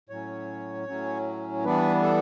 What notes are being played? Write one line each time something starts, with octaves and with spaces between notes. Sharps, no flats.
A2 F#3 C#4 C#5
A2 F#3 C#4
E3 G3 B3 D4 B4
A4